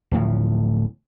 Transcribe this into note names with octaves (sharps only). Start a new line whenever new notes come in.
D1 A2 F3